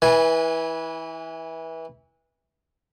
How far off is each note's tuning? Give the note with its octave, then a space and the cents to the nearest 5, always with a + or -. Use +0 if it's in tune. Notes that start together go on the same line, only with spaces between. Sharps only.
E3 -20 B4 -20 G#5 +0